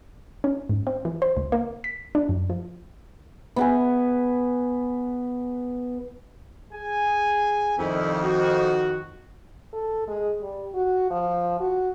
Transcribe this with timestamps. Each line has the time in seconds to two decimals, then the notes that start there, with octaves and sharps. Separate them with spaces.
0.44 C#4
0.69 G#2
0.87 C4
1.05 E3
1.22 C5
1.37 C#2
1.52 A#3
1.84 B6
2.15 D4
2.29 F#2
2.50 F3
3.56 B3 B4 G#5
6.73 G#4 G#5
7.78 C2 F2 D#3 E4
8.23 F#4
9.73 A4
10.08 G#3
10.42 G3
10.74 F#4
11.10 F3
11.60 F#4